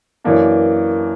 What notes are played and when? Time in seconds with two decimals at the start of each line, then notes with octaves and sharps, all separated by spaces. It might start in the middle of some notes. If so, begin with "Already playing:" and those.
0.24 F#2 E3 A#3 D4